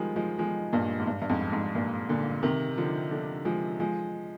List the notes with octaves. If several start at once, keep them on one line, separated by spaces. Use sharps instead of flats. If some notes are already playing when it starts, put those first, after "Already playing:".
Already playing: D#3 F3 G3 G#3
F3 G#3
F3 G#3
G2 A#2
G#2
G2
G2
F2 G#2
F2 G#2
G2 A#2
A#2 D3
C3 D#3
D3 F3
D3 F3
F3 G#3
F3 G#3